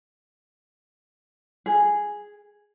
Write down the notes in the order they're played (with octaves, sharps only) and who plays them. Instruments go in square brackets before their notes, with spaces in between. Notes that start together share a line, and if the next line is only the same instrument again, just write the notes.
[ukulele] G#4